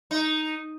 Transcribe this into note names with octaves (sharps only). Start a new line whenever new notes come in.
D#4